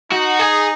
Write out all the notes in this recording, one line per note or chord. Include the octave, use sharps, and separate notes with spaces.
D#4 F#4
G#4